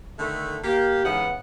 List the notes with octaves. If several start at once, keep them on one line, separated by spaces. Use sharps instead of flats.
D3 D#3 A3
A#3 G4
G#2 C#3 E3 B3 F#5